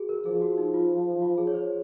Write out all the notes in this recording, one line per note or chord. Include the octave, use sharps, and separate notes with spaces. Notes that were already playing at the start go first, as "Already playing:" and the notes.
Already playing: F#4 G#4
A#4
F3 G#4
F#4
D#4
F4
F4
G#4
C#5
C5